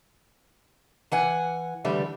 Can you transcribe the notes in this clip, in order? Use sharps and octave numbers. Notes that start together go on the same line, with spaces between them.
E3 F#5 G#5
D2 E3 G3 A3 D4